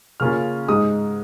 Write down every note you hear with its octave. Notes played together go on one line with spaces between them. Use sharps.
C#3 A#3 C#4 F4 F6
G#2 G#3 D#4 D#6